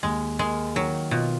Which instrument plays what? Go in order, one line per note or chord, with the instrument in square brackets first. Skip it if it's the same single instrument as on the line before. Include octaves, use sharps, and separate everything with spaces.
[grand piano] D#2 [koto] G#3
[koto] G#3 [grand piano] A#3
[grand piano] D#3 [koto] F#3
[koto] B2 [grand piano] F4